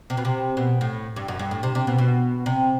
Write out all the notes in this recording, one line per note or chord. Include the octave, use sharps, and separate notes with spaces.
C3
B2
C3
B2
A2
G2
F#2
G2
A2
C3
C3
B2
B2
C3